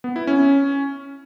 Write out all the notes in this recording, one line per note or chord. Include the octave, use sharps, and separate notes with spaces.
B3
E4
C#4